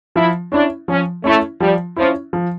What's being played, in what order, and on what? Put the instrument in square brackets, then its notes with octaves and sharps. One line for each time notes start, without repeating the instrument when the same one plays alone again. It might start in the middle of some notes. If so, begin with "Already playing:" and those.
[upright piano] F3 [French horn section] E4
[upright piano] C#4 E4 [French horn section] D4
[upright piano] F3 [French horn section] C#4
[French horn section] A3 [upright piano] C#4 E4
[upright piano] F3 [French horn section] G3
[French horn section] F3 [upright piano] C#4 E4
[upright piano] F3